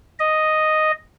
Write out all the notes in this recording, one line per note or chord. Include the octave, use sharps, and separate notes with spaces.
D#5